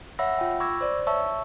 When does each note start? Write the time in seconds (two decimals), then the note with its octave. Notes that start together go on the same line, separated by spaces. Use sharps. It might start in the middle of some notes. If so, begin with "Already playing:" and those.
0.19 C#5 E5 F#5 B5 E6 A#6
0.39 F4 G5
0.60 B5 C#6 D6 E6 G#6 A#6
0.81 C5 D5
1.07 C#5 E5 A5 C#6 E6